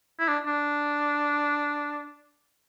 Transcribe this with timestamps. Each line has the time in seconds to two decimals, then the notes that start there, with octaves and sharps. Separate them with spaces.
0.19 E4
0.28 D4
0.46 D4